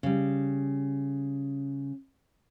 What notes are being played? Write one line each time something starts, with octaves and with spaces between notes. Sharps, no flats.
C#3 G3